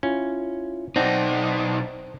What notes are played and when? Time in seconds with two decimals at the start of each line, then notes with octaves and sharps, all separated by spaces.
0.03 C#4 E4 F4
0.96 B1 C4 D#4 D5 F#5 A5